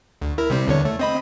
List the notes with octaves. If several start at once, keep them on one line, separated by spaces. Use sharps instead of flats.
D2
E4 A#4
C3 G3 C4
E2 D3 C#5
A3
C4 D#5 B5